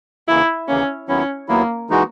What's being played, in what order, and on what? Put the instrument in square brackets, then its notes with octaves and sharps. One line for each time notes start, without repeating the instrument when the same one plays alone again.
[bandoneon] D#2 C#3 E3 A#3 [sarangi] E4
[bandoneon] D#2 C#3 E3 A#3 [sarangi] C#4
[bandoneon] D#2 D#3 F#3 B3 E4 [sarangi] C#4
[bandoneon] D#2 D#3 F#3 B3 E4 [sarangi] A#3
[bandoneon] E3 G#3 D#4 F#4